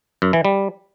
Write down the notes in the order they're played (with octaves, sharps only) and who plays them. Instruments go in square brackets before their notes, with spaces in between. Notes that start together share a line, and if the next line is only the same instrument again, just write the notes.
[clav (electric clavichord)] F#2
E3
G3